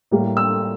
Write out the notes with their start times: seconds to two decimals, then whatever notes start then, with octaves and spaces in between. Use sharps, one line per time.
0.11 A2 G3 A#3
0.37 E6